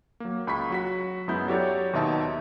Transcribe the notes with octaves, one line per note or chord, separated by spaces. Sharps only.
F#3 A#3
C#2 B5 C#6 B6
F#3 F#4 B6
F#2 G#3 B3 E4 G6
F#3 F#4 G4 A4 C#5 D5
D#2 B2 D#4 E5 A5